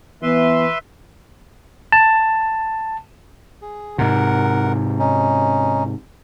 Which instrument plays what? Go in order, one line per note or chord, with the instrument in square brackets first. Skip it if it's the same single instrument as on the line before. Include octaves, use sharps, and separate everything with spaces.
[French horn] E3 [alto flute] B3 [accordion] B4 E5 C6
[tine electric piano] A5
[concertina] G#4
[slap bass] G#2 C3 [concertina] A#4 F#5
[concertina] C#4 D#4